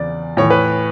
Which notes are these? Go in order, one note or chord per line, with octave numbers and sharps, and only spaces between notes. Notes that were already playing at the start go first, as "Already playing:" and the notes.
Already playing: E2 C#3 D5
A2 E3 C#5
B4